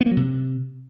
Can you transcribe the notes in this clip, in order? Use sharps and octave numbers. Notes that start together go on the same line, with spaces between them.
B3
A#3
F#3
C3